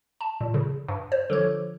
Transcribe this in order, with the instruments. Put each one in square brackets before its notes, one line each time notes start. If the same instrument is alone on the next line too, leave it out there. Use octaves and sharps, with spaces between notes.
[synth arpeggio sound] A5
A#2
C#3
G2
C5
[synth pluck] D3 F3 C#5